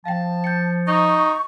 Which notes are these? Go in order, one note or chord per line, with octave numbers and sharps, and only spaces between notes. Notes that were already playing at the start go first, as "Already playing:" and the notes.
F3 F5 G5 A5
G6 A6 C#7
D#4 C#6